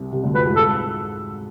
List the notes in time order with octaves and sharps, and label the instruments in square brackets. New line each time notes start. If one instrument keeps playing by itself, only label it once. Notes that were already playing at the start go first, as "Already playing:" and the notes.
Already playing: [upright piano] C2 C3
C2 C3
D2 D3
[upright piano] F2 F3 [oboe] B4
[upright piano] G#2 G#3
[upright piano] G#2 G#3 [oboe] A4